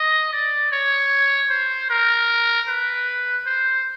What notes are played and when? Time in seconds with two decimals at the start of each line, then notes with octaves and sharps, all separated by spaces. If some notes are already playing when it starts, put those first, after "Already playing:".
Already playing: D#5
0.32 D5
0.72 C#5
1.50 C5
1.90 A#4
2.68 B4
3.46 C5